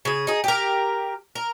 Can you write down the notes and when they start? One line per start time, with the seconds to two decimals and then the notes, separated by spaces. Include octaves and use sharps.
0.05 C#3 G#4
0.27 D#4 G#4
0.44 G4 A#4
1.35 A#4